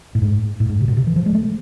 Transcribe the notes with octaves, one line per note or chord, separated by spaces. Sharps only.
A2
G#2
A2
G#2
C3
B2
C3
E3
F3
G#3
A3